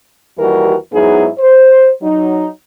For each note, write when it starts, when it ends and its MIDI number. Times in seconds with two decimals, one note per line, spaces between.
0.38 0.74 39
0.38 0.74 52
0.38 0.74 55
0.38 0.74 66
0.38 0.74 67
0.38 0.74 70
0.93 1.27 44
0.93 1.27 54
0.93 1.27 59
0.93 1.27 63
0.93 1.27 64
0.93 1.27 68
1.38 1.90 72
2.02 2.47 54
2.02 2.47 63